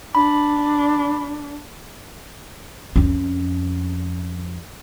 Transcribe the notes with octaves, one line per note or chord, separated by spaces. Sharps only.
D4 B5
F2 C#4